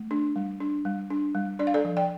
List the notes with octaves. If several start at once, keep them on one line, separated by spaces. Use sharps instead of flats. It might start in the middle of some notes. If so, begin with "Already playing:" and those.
Already playing: A3
D4
G3
D4
G3
D4
G3
D4 D5
F5
A4 D5
F3
D5 G5